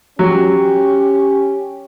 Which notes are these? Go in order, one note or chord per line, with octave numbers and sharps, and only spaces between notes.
F#3 C#4 G4